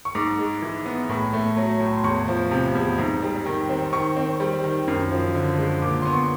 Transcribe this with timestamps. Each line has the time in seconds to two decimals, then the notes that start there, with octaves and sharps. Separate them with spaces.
0.05 C#6
0.15 G#2 D6
0.39 G#3
0.62 E3
0.86 B3
1.09 A2
1.33 A3
1.57 F#3
1.80 A2
1.97 C6
2.04 E2 C#6
2.28 F3
2.51 C3
2.75 E2
2.98 G#2
3.22 G3
3.46 D#3
3.69 C4
3.93 D#3 C#6
4.16 C4
4.40 G3
4.64 D#3
4.88 F#2
5.11 F3
5.35 D3
5.58 G#3
5.82 A#2 D6
6.02 B3 C6
6.13 C#6